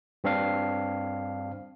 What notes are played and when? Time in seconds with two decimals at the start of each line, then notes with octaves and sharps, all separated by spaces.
0.24 G2 C4 D4 F5